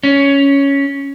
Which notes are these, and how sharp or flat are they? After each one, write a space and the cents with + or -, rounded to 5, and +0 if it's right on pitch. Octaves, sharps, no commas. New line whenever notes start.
C#4 +5